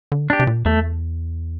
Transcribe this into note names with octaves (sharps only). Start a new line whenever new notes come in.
D3
D4 G4
C3
A#2
E2 A3